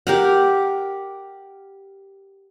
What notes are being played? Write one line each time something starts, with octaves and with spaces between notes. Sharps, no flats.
G4 A#4 F#5